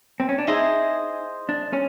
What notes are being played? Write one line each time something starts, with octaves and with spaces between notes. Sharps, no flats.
C4
C#4
D4
D#4 E4 G#4 C5 D#5
D4
C#4